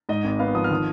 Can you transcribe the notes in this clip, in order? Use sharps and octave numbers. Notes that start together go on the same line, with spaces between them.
G#2 D#5
G#1
B3 F5
F3 D#6
F6
D#3 D#6